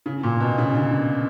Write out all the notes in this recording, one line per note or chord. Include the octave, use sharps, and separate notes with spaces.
C#3
A#2
B2
C#3
D3